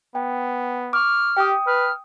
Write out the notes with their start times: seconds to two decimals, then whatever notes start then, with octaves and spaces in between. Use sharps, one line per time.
0.15 B3 G5
0.93 C#6 D6 F6
1.37 G4 G5 D#6
1.67 B4 F6